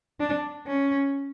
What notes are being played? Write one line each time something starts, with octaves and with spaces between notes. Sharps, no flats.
D4
C#4